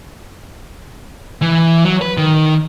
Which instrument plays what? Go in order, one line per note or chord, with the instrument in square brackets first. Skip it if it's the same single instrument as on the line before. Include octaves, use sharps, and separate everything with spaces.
[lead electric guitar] E3
F#3
B4
D#3